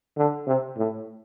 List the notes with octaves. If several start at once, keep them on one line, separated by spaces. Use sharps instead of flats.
D3
C3
A2